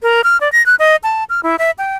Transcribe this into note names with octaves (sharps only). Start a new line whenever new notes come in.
A#4
F6
D5
A#6
F#6
D#5
A5
F6
E4
E5
G5